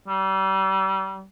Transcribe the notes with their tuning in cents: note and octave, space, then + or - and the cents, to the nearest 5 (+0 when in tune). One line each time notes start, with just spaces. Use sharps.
G3 -35